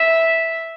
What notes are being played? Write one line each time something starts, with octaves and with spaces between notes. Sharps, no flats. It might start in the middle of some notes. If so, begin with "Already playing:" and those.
Already playing: E5